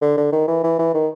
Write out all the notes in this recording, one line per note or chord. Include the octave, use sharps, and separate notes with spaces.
D3
D3
D#3
E3
E3
E3
D#3